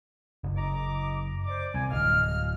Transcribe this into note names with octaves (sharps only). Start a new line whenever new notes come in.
F#1
D#5 A#5 D6
C5 D5 D6
C2 G#5
D1 D#5 F5 F6